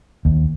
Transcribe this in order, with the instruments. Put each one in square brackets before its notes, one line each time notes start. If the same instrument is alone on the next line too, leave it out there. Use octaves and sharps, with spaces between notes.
[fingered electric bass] D#2